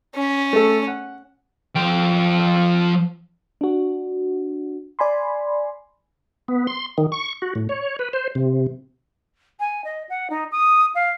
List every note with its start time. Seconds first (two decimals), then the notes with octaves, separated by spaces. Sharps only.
0.15 C#4
0.53 A3 A4
0.87 F#5
1.76 F3 G5
3.61 D4 F#4
4.99 D5 G#5 B5 C6
6.48 B3
6.67 C6
6.98 D#3
7.12 C#6
7.42 F#4
7.55 A2
7.69 C#5
7.99 B4
8.13 C5
8.35 C3
9.59 G#5
9.84 D#5
10.09 F#5
10.29 D#4
10.51 D#6
10.94 F5